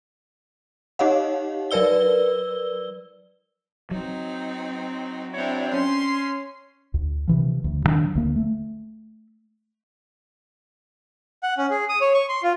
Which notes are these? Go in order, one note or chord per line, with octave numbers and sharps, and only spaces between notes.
D#4 G4 C#5 D#5 F5 F#5
F#3 A#4 B4 D5 E6 G7
F#3 C4 D#4
C4 D4 E4 C#5
C#4 C6
D2
C3 E3 F3
D2
G2 D#3 F#3 D4
D2 A#3
A3
F#5
C#4
G#4
D#6
C#5
C#6
C6
F4